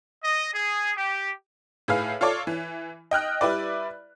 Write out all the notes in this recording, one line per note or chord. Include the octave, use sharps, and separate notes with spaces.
D#5
G#4
G4
A2 G#4 B4 F5
F4 A4 C#5 D5
E3
D#5 G5 F6 F#6
G3 E4 B4 D5